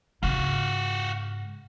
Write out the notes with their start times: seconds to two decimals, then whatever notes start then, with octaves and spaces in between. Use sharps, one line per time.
0.23 G#2 C#3 F4 F#4